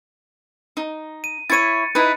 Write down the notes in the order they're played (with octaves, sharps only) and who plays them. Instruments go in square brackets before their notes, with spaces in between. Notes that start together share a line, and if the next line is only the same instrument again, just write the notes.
[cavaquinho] D#4
[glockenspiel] D#7
[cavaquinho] E4 C#5 [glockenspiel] A6 C#7 D#7
[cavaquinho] D#4 E4 B4